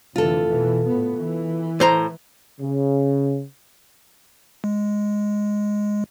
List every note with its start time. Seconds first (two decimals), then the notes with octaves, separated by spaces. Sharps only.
0.16 F1 D3 E3 F4 A4
0.48 B2 E3
0.87 A2 B3
1.18 E3
1.80 A2 C5 A#5
2.60 C#3
4.64 G#3